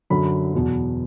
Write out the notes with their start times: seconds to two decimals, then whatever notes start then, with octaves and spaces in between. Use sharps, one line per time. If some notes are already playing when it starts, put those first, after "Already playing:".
0.10 F#2 D3 F#3 B5
0.53 E2 B2 F#3